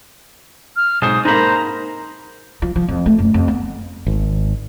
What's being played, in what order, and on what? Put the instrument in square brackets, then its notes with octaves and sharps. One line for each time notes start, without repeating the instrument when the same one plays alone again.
[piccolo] F6
[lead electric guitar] B1 C5 [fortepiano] G#2 [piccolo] D#6
[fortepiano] G#2 A#3 [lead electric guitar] D#4 B5 [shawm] C5 [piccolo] A#5
[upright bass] F3
F3
F2
A3
F#2
F2
B3
[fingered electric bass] G#1